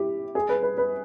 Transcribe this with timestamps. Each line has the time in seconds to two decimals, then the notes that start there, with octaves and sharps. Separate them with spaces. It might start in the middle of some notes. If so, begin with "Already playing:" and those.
Already playing: E4 G4
0.35 G#4
0.49 B4
0.63 B4
0.78 B4